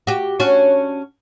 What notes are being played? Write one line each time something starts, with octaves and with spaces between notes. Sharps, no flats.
F#4 G4
C#4 D4 F#4